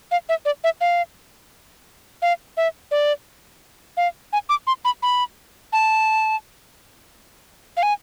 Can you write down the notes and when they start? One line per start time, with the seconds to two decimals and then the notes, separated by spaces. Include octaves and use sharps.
0.11 F5
0.29 E5
0.45 D5
0.64 E5
0.81 F5
2.22 F5
2.57 E5
2.91 D5
3.97 F5
4.33 G#5
4.49 D6
4.67 C6
4.85 B5
5.02 B5
5.73 A5
7.77 F5
7.83 G#5